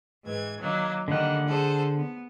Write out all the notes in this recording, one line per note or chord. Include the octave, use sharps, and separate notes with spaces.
G#2 E3 G#6
D#3 F#3 A#3
D3 D#3 G3 A#3 F#5
G#4 A4 C5
B3